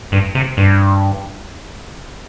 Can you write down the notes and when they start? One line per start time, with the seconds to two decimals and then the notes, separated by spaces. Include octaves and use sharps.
0.12 G2
0.35 C3
0.57 G2